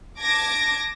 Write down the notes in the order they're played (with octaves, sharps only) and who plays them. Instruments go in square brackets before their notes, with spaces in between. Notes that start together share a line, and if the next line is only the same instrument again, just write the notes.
[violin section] A5 D6 G#6 A#6